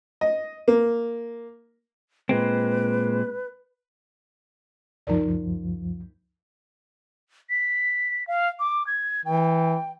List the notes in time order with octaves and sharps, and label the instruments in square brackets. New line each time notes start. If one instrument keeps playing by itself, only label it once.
[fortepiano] D#5
A#3
[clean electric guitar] A#2 G#3 C4 [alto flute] B4
[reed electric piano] C#2 F#2 F3 [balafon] D#4 A#4 D5
[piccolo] B6
F5
D6
G#6
[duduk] E3 [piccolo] G5